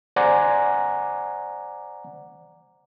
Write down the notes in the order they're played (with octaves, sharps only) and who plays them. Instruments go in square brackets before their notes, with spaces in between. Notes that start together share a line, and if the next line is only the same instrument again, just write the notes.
[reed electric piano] C5 D5 F#5 G#5 A#5 D6